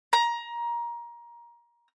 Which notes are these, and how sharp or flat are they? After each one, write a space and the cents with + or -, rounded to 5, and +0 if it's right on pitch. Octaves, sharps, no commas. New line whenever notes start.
A#5 +20